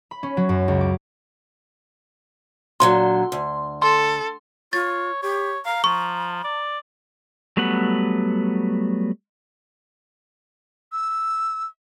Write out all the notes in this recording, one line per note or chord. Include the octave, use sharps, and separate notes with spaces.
B5
C#4
F#3
F#2
C#2
D6
A#2 D3 F#3 C6
D2
A4 C6
F4 C#5 A6
G4 C#5
F5 A#5
F3 C#6
D5
F#3 G3 A3 B3 F#5
E6